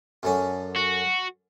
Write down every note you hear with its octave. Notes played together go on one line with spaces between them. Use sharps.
F#2 D3 C#4
F#4